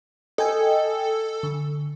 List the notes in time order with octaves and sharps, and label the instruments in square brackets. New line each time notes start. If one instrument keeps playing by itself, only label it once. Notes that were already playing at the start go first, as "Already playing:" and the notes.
[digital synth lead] A4 [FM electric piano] D#5 G5 G#5
[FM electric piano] D3